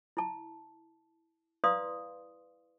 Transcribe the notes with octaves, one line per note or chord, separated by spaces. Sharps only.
E4 A5
E4 B4 D5 F5 C6 D#6